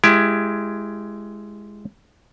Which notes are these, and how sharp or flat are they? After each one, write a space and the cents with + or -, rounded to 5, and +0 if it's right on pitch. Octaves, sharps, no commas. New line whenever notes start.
G#3 +0 E4 +25 G4 +0